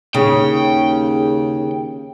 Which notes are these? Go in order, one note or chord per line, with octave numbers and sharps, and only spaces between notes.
D#2 C#3 G5